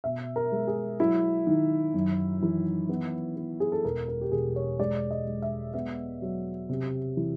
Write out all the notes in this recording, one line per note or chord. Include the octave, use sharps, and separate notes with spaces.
B2 E5
A#4
G#3
G#4
F#3 E4
D#3
F#2
E3
B3
B3
G#4
A4
E1 A#4
A#4
G4
E1 G#4
C#5
G#3 D5
D#5
G#3
E5
B3 E5
F#3
C3
E3